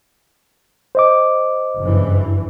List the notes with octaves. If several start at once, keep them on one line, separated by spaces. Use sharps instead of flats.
C5 D#5 D6
F#1 G2 E3